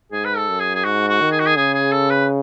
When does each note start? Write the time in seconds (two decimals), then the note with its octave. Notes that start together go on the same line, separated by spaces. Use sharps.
0.12 G#2 G#4
0.25 B4
0.36 A4
0.49 F#2
0.60 G#4
0.75 G#4
0.84 G#2 F#4
1.09 F#4
1.21 D#3
1.32 G#4
1.40 F#4
1.46 G#4
1.56 C#3 G#4
1.74 G#4
1.92 A4
2.10 B4